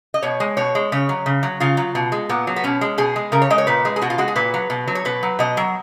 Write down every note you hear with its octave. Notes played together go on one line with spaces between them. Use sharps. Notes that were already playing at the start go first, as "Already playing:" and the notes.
D#5
B2 C#5
G#3
B2 C#5
G#3
C#3 C#5
F#3
C#3
F#3
C#3 F4
F#3
B2
G#3
A#2 B3
F#3
B3
B2 C#4
G#3
B2 G#4
G#3
C#3 A#4
C#5
G#3 D#5
C#5
A#2 B4
G#3
G#4
B2 F#4
F4
G#3 F#4
G#4
A#2 B4
F#3
B2
F#3
C#5
B2 B4
F#3
B2 D#5
F#3